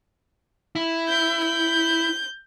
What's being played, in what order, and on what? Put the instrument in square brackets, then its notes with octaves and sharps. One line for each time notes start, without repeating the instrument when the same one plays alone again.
[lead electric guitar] E4
[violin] G6
G6